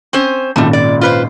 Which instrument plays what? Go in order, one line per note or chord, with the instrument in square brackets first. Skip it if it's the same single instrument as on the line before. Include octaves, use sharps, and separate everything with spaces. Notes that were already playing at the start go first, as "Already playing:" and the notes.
[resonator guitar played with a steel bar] C4 C#4 C5
[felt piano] G#1 C#2 A#2 [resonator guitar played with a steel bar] G3 A3
[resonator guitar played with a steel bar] D5
F4 B4 C5